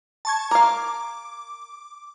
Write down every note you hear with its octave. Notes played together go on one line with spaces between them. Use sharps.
A5 C#6 G#6
A#4 F5 D6